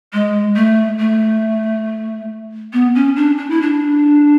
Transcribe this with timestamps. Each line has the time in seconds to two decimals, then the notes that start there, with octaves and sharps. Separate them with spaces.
0.13 G#3
0.56 A3
0.99 A3
2.73 B3
2.95 C#4
3.16 D4
3.38 D4
3.50 E4
3.62 D4